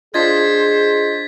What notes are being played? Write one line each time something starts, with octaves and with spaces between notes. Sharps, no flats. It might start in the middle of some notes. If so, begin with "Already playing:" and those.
D4 F4 G#4 C5 D#5 G#6 A6 B6